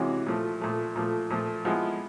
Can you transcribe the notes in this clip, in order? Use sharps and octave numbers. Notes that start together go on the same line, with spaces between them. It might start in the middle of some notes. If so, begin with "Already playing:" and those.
Already playing: C3 E3 G#3 C#4 F#4
A#2 F3 A3
A#2 F3 A3
A#2 F3 A3
A#2 F3 A3
F3 G#3 B3 E4